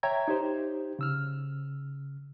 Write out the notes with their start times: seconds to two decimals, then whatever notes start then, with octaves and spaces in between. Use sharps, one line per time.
0.03 C#5 E5 G5 A#5 G#6
0.28 D#4 G4 C5
0.99 C#3 E6 F6